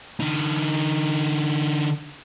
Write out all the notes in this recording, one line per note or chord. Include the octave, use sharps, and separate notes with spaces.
D3 D#4